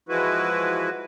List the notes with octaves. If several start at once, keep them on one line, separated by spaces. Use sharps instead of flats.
E3 F3 G#3 E4 F#4 B4